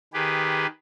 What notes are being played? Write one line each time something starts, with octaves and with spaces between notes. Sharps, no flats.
D#3 G4 G#4 B4